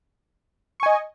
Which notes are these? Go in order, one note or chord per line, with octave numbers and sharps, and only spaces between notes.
D#5 G#5 C#6